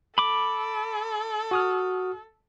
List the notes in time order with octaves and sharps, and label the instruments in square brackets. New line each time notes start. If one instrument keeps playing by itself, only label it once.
[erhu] A4 [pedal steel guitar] B5 D6
[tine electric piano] F#4 D#6 F6